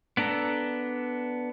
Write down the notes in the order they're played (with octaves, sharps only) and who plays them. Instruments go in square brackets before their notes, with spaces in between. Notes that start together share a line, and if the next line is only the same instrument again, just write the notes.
[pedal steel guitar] B3 D4 A4 A#5